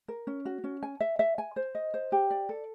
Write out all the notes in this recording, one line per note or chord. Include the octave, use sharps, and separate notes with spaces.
A#4
C#4
F#4
C#4
G#5
E5
E5
G#5
C5
D#5
C5
G4
D5
A4